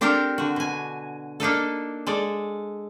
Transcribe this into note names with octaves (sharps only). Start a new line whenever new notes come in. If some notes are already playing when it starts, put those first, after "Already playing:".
C4 D4 G4 A4 A#4 C5
D3 F#4
B2 G#5
A#3 D4 D#4 A4
G#3 A4 D5